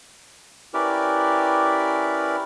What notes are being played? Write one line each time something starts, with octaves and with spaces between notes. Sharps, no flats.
C#4 E4 G4 A#4 B4 D5